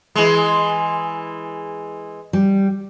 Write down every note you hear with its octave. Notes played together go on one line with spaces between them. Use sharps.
E3 G#3
G3